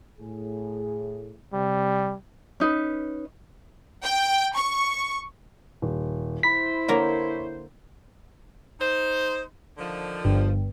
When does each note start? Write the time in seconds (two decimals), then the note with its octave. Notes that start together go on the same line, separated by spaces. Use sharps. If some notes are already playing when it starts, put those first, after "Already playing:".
0.20 A2 G#4
1.53 C3 G3
2.60 C#4 D#4 B4
4.02 G5
4.56 C#6
5.82 D#1
6.43 E4 C5 B5 B6
6.88 D3 A#3 A#4 C#5
8.80 D#4 C5
9.78 D3 D#3 F3
10.25 G1